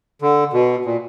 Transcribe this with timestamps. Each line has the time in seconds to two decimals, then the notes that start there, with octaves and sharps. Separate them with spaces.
0.22 D3
0.53 B2
0.85 A#2